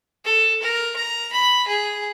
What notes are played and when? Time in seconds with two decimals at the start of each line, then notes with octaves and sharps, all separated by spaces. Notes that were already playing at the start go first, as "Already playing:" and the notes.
0.25 A4
0.62 A#4
0.96 A#5
1.33 B5
1.67 G#4